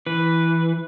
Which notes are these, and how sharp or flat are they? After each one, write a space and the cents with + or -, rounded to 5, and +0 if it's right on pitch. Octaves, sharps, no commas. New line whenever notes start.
E3 +0 B4 +0